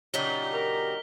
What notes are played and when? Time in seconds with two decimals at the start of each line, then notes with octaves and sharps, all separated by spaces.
0.14 A#2 C#3 F#3 G3 D4 D#4 B6 G7
0.53 A#4